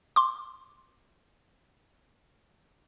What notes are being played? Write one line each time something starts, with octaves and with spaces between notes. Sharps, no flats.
C6 D6